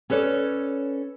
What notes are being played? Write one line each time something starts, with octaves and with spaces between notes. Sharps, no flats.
C#4 A4 B4 C#5 D5